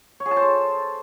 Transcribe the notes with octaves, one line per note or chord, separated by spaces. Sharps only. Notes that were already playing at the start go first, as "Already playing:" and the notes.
C#5
G#4
A5
C5
A4